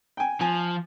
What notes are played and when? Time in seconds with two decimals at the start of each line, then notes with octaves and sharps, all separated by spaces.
0.17 G5 G#5
0.41 F3 G#5